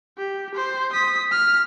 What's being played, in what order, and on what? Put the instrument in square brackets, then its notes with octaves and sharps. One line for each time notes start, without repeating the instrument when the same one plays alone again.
[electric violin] G4
C5
D#6 B6
F6